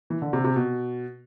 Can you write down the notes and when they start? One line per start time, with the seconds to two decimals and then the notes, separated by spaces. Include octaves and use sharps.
0.10 E3
0.22 D3
0.33 C3
0.45 C3
0.56 B2